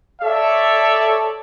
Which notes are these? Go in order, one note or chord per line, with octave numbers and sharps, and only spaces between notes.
A4 C#5 D5 E5